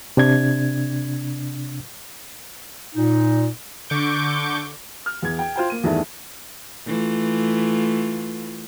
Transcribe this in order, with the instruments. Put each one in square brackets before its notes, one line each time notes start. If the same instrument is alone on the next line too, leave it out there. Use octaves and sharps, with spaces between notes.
[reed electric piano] C3 D4 G#6
[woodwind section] A#2 D#4
[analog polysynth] D3 C#6 D6 G6
[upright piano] F6
E2 G#6
G5
F4 C5 G5
A#3 D#7
E2 G2 D#3 A3 D4 E4
[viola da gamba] E3 A3 F4